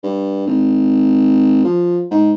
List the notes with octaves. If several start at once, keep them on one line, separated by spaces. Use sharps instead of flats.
G2
G#1
F3
G#2